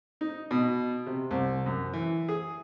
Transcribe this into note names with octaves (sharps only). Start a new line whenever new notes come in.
D#4
B2
C3
C2
F#2
E3
G#4